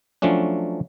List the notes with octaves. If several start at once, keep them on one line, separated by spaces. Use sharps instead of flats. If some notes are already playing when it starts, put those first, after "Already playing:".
F3 F#3 A3 C#4 D4